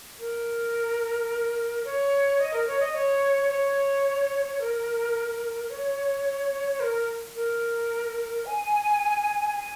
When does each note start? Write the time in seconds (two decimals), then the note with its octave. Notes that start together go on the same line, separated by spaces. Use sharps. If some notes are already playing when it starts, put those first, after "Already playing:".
0.19 A#4
1.85 C#5
2.40 D#5
2.53 A#4
2.67 C#5
2.80 D#5
2.94 C#5
3.49 C#5
4.60 A#4
5.70 C#5
6.80 A#4
7.35 A#4
8.45 G#5
9.55 G#5